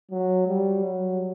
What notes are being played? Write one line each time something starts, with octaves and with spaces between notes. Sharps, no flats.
F#3
G3
F#3